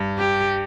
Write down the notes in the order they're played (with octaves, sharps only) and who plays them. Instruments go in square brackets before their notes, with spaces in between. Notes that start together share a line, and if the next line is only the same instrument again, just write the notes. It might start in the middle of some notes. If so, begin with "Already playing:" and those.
Already playing: [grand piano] G2
[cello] G4